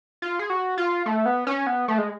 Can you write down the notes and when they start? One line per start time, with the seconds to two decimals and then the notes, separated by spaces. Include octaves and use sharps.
0.22 F4
0.39 G#4
0.50 F#4
0.78 F4
1.06 A3
1.26 B3
1.47 C#4
1.67 B3
1.88 A3
1.98 G#3